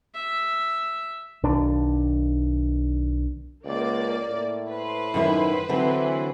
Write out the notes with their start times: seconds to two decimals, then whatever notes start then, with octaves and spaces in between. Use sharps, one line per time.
0.14 E5
1.43 B1 D#3 D4
3.64 C#2 A#3 D5
4.30 A2
4.69 B4 C5
5.14 F#2 D#3 E4
5.69 D3 E3 F#3 C4